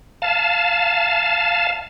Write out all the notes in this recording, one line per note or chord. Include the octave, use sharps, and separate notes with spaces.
F5 A5